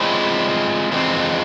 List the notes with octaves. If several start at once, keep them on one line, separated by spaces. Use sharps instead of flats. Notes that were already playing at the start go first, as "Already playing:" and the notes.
Already playing: F3 G#3 C4 E4
F2 E3 G#3 C4